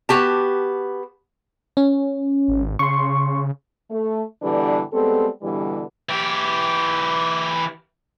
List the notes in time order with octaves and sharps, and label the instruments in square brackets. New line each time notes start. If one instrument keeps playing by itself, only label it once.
[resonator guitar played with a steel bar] B3 F#4 G4 A5
[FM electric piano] C#4
[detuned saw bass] G#1
[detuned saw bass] C#3 [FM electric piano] C6 C#6
[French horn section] A3
G2 B2 D3 E3 G3 D4
G3 G#3 B3 C4 A4
G2 B2 D3 E3 G3
[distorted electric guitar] E3 G4